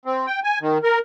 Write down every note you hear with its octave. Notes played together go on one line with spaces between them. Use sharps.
C4
G5
G#5
D#3
A#4